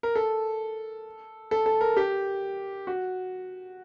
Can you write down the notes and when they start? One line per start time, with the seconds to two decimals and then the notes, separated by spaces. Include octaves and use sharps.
0.03 A#4
0.16 A4
1.51 A4
1.66 A4
1.81 A#4
1.97 G4
2.87 F#4